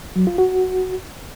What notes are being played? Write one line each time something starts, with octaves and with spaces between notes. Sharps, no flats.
F#3
F4
F#4